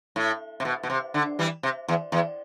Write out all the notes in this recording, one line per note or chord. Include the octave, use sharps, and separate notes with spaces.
A2
C3
B2
B2
C3
D3
E3 G3
C3
E2
E2